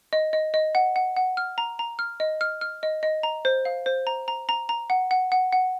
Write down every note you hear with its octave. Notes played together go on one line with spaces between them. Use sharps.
D#5
D#5
D#5
F#5
F#5
F#5
F6
A#5
A#5
F6
D#5
F6
F6
D#5
D#5
A#5
C5
F5
C5
A#5
A#5
A#5
A#5
F#5
F#5
F#5
F#5